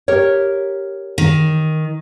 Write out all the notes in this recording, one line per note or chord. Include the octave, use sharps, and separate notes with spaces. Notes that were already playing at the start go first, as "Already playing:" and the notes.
G4 A#4 C#5
D#3